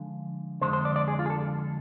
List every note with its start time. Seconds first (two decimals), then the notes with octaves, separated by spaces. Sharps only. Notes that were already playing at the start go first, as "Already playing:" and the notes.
Already playing: D3 F3 G#3
0.61 F2 D3 G#3 C5
0.73 C5
0.85 D5
0.96 D5
1.08 G#4
1.19 F4
1.26 G#4
1.30 A4